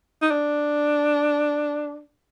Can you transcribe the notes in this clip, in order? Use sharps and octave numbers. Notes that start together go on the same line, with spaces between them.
D#4
D4